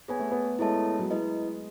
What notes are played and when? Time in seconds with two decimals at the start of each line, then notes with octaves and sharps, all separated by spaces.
0.08 B3 G#4 C#5 G#5
0.19 A3
0.31 B3
0.59 G#3 E4 A4 C#5 E5 A5
0.99 F#3
1.10 G#3 E4 B4 D#5